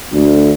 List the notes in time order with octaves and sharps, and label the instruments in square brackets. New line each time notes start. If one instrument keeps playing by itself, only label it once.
[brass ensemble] D2